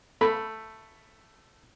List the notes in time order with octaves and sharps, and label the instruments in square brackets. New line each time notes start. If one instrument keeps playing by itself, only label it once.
[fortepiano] A3 B5